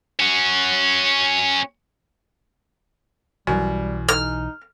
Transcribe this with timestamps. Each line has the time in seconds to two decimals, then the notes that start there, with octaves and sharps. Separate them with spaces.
0.20 C#4 F#4
3.47 B1 F#2 E3 G3
4.09 D#4 F6